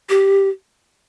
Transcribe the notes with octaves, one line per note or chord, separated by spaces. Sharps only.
G4